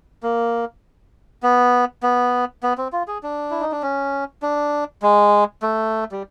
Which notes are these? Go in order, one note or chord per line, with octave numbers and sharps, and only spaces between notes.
A#3
B3
B3
B3
C4
F4
G#4
D4
E4
D#4
D4
C#4
D4
G#3
A3
G3